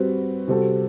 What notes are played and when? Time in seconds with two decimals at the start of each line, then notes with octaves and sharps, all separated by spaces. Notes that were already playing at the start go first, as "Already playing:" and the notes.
Already playing: G3 C4 F#4 B4
0.48 C3 G3 C4 F#4 A4